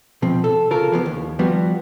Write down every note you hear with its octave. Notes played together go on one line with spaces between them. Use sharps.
B2 F3 C4
A4
C#3 F4 A4 A#4
E3 F3 B3
D#2
F3 G3 B3 F#4